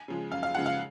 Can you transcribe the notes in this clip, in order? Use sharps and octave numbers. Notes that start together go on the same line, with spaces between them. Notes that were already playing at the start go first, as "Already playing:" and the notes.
Already playing: G#5
C#3 F3 G#3
F#2 F5
F5
C#3 F3 G#3 F#5
F5